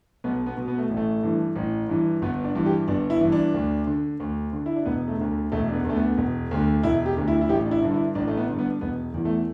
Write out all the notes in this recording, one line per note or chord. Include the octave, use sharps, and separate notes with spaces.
B1 B3
B3
B2
B3
A3
A1
A3
G2 E3
A1
G2 E3
G1 B3
D4
G2 E3
G4
G1 D4
E4
G2 E3
D4
D2
D3
D2
D3
E4
D4
E1 B3
A3
D2 D3
E1 A3
D4
B3
D2 D3 A3
B3
E1
D2 D3
E1 E4
G4
D2 D3
E4
E4
A1 G4
D4
E4
G2 D3
E4
A1 D4
A3
B3
G2 D3
B3
E1 B3
E2 E3
A3